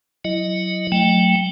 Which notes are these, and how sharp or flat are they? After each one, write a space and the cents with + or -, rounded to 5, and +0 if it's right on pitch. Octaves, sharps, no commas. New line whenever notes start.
F#3 +0 E4 +15 D#5 +0
F#3 -15 A3 +10 G5 +0